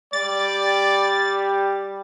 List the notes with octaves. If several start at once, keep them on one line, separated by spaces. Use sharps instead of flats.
G3 D5 A6